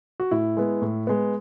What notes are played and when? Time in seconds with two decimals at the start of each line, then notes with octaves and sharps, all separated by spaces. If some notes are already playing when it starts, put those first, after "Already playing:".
0.20 F#4
0.31 A2 E4
0.57 G#3 B3
0.82 A2
1.07 G#3 B3